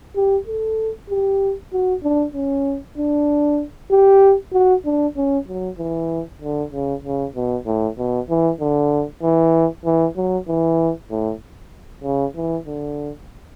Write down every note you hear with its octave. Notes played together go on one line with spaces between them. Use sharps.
G4
A4
G4
F#4
D4
C#4
D4
G4
F#4
D4
C#4
F#3
E3
D3
C#3
C#3
B2
A2
B2
E3
D3
E3
E3
F#3
E3
A2
C#3
E3
D3